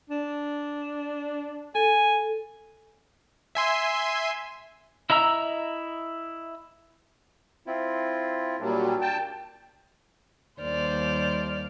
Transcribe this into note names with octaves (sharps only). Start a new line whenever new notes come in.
D4
A4 G#5
E5 G#5 C6
E4 D#5 E5 A#5 E6
C4 E4 F4
A#2 F#3 G3 A#3 D4
G5 A5
D#2 G3 C5 D5 F6